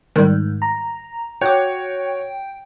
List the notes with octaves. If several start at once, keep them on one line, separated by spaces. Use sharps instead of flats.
G#2 D#3 G3
A#5
F#4 C#5 G5 D6 F#6